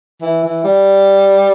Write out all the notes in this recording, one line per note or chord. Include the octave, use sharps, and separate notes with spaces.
E3
E3
G3